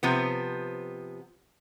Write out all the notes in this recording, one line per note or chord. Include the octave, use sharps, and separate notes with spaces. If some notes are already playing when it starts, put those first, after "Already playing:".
C3 F3 B3